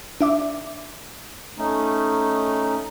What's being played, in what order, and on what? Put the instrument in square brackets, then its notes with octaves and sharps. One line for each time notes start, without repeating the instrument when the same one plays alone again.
[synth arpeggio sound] D4 E5 D6
[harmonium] A3 C#4 D#4